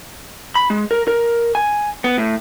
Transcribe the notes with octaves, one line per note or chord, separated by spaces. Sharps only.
B5
G#3
A#4
A#4
G#5
B3
A2